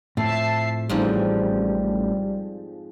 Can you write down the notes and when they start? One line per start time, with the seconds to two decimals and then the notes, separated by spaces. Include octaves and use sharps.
0.17 F2 A2 E5 A5 C7
0.89 A1 F2 G#2 F3 G3